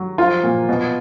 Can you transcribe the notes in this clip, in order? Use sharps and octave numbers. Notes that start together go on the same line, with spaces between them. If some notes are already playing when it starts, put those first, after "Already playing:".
Already playing: F#3
F3 F4
A#2
B2